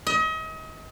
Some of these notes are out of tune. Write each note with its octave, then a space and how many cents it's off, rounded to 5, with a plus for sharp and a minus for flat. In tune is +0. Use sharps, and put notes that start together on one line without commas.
D#5 +35